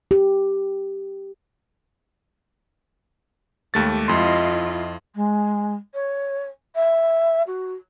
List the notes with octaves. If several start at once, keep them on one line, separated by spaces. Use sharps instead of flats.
G4
D#2 G#3 A3 G4 A6
F2 E4 F4 D#5 C6
G#3
C#5
E5
F#4